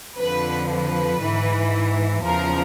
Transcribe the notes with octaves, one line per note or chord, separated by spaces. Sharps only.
F2 D3 F3 B4
B4
G#2 E3
E2 C#3 F3 A#4